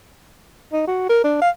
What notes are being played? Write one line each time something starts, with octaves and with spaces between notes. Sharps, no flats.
D#4
F#4
A#4
D4
F5